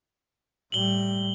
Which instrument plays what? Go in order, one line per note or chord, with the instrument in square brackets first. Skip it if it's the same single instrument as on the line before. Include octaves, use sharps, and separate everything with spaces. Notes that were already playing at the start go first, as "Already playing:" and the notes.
[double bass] A2 G3 [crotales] F#7 G7